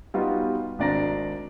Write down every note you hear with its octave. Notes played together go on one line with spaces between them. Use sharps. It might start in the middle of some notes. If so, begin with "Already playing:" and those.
G3 B3 D#4 F4 F#4
G#1 D4 D5 A#5 A#6